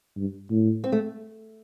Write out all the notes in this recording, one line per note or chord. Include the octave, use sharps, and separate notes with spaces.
G2
A2
C4
A3